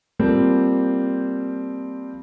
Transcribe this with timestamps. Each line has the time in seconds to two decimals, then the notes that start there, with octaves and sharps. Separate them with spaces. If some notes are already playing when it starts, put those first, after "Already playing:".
0.19 F3 G3 A#3 C4